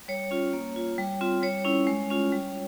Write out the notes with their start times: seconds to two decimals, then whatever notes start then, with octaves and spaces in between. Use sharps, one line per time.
0.08 G3 C#5
0.31 C#4 F4
0.53 A#3
0.76 F4
0.98 G3
1.21 C4 F4
1.43 G3 C#5
1.65 C#4 E4
1.87 G#3
2.10 C#4 F4
2.32 G3